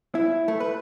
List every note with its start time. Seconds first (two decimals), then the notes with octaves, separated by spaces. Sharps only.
0.15 E4
0.48 A3
0.60 B4